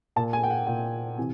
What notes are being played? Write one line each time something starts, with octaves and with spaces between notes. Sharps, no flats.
A#2 A5
G#5
G5
F#5
A#2 G5
C3 E3 G#5